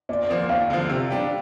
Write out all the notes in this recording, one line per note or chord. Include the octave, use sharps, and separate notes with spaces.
A#2 D5
F3 A#3 F4
D#2 F5
D3 F3
C3
G3 D4 G4